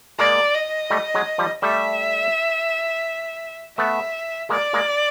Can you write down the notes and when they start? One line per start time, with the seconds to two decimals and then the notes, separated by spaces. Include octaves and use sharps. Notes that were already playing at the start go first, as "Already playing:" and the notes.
0.19 G#3 A#3 D5
0.54 D#5
0.90 G3 A3
1.14 F#3 G#3
1.38 F3 G3
1.62 G3 A3 E5
3.78 A3 B3 E5
4.49 G#3 A#3 D5
4.73 G#3 A#3